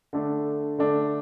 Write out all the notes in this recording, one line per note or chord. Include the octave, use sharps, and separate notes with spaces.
D3 A3 D4
D3 A3 D4